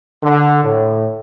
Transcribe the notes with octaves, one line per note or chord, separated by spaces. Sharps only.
D3
A2